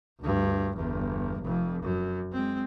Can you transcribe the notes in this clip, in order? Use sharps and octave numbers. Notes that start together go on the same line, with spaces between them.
D2 G2
G1 E2
F1 F2
F#2
G#3 C4